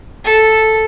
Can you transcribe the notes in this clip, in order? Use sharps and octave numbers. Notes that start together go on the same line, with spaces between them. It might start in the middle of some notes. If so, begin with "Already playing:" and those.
A4